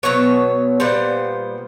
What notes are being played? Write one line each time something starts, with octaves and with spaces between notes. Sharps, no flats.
B2 F#3 B3 C#5
A#2 G3 B3 C5